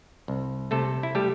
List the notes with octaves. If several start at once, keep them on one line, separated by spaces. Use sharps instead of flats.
C2
C3 A3 A4
E4
G3 A3 G4